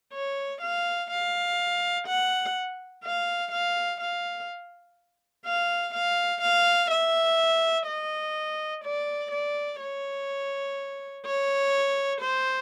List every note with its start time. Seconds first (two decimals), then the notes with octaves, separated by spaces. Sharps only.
0.13 C#5
0.62 F5
1.11 F5
2.08 F#5
3.04 F5
3.52 F5
4.01 F5
5.46 F5
5.94 F5
6.41 F5
6.91 E5
7.87 D#5
8.84 D5
9.31 D5
9.80 C#5
11.26 C#5
12.21 C5